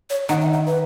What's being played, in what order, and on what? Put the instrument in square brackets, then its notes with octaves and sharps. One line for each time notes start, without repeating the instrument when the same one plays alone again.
[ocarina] C#5
[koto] D#3 [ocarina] F#5
[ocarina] E5
E5
B4